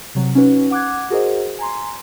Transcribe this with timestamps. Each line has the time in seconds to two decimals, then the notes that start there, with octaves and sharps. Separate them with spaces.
0.15 C3 F#3
0.35 C#4 D#4 F#4 B4
0.71 F#5 D6 F#6 G#6
1.10 F#4 G#4 A#4 C5 D#5
1.59 G#5 A#5 C6